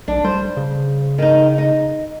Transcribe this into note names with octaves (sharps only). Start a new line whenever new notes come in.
B1 D4
G3 C5
C#3
D#3 D#4
D#4